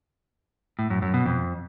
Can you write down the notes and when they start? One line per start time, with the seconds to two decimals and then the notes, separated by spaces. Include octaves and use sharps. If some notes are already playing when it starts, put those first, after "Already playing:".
0.79 A2
0.90 F#2
1.02 F#2
1.14 B2
1.25 F2